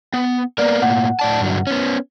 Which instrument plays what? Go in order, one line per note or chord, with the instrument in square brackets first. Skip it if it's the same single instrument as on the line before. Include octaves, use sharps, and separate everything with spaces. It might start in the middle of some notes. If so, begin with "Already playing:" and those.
[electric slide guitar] B3
[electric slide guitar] A#3 B3 A#4 [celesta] D5
[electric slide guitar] A2 A#3 [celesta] F#5
[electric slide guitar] A2 D5 A5
G2 D3 F#3
B3 C#4